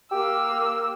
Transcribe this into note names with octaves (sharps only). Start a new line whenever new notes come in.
A#3 G4 E6